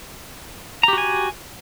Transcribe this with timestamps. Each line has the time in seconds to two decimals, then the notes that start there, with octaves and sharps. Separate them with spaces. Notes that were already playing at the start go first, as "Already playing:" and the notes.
0.83 A#5
0.88 G4
0.93 F#4
0.98 G#5